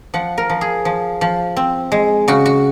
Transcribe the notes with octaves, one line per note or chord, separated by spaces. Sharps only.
F3 F#5
A#4
F3
G#4
F3
F3
C4
G#3
C#3 F#4
F#4